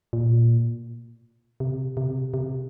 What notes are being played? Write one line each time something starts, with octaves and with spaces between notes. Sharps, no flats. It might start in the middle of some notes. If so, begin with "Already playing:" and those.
A#2
C3
C3
C3